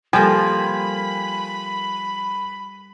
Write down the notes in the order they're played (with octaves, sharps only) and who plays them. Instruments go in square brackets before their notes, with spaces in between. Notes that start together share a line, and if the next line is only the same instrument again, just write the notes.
[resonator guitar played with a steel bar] F3 A#3 [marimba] G3 G4 A4 [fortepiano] G5 G#5 [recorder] B5